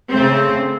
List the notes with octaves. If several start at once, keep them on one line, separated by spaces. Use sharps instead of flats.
C#3 A3 C4